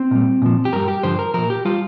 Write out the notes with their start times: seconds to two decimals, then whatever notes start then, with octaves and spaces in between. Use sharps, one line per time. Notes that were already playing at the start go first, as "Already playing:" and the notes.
Already playing: C4
0.11 A#2 G3
0.42 A#2 F3
0.65 G4
0.73 G2 G3 A#4
0.88 G4
1.03 G2 D3 F3 C5
1.19 A#4
1.34 A#2 F3 A#4
1.50 G4
1.65 G3 F4